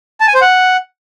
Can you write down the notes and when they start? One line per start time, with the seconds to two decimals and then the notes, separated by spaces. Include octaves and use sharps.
0.20 A5
0.27 G#5
0.34 C5
0.41 F#5